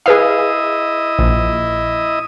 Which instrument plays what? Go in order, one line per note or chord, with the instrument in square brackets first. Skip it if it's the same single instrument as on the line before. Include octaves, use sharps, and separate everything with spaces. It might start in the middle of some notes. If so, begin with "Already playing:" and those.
[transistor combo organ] E4 D#5 [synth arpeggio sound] G#4 B4 F5
[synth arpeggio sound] A#1